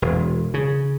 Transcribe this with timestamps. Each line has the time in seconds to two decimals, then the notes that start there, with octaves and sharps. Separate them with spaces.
0.02 E1
0.54 C#3